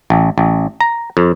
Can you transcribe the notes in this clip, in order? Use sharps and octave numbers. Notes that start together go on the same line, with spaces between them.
A1
A1
A#5
F2